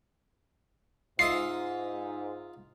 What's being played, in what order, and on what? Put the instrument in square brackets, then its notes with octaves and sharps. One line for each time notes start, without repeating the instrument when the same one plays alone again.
[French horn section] G#2 [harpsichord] F4 D#5 E5 [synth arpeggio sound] C7